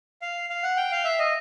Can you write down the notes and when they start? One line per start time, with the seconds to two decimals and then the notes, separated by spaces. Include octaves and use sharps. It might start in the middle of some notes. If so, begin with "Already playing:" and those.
0.22 F5
0.50 F5
0.63 F#5
0.77 G5
0.92 F5
1.04 E5
1.19 D#5